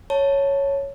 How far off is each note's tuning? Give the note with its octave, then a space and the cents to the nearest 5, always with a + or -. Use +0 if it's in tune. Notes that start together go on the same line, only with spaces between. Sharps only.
C#5 +0 A5 +10